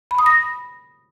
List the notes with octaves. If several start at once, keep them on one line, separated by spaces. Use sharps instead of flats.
B5
D#6
A#6